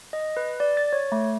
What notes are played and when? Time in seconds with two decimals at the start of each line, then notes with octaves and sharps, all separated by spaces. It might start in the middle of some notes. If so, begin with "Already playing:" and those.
0.13 D#5
0.37 B4
0.60 D5
0.77 A6
0.93 C#5
1.12 A3